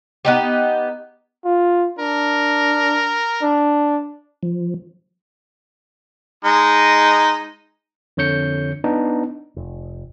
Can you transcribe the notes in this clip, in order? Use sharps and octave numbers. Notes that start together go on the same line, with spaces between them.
B3 D#4 G4
F4
D4 A#4
D4
F3
G#3 D#4
F2 D3 C#5 G6 C#7
B3 D4 D#4
F1